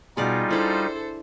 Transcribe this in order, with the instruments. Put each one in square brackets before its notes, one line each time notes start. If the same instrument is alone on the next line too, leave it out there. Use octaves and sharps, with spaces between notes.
[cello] B2 [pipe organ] G3 D#4 F4 [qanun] G#4 D5 F#5
[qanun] D4 E4 [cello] A4 C5